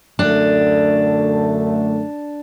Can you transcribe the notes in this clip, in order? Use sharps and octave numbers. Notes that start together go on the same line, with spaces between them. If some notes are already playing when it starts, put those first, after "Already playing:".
F#2 D3 A3 D4